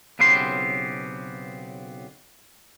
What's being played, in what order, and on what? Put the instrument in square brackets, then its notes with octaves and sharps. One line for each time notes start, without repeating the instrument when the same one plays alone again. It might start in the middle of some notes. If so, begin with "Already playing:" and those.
[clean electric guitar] B1 C#3 B3 C4 G4 C6